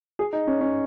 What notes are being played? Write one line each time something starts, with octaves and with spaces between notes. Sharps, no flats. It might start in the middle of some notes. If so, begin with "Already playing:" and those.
G#4
D#4
C#4
C#4